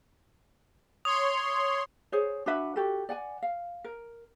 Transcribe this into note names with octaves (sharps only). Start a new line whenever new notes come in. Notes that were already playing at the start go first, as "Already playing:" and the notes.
C#5 C6 D#6
G#4 C5 C#5
D4 F#4 B4 E5
F#4 G4 A4
D5 F#5 G#5
F5
A#4